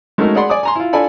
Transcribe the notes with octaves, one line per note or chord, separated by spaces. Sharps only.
G#3 A3 C#4 D#4 F#4 A#4
G#4 D5 F#5 B5 C6
D5 G#5 D6 D#6
G#5 A#5 C6
E4 F4
D4 F4 A4 D5 G#5 B5